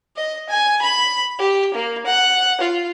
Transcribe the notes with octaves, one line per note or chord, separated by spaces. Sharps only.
D#5
G#5
B5
G4
A#3
F#5
F4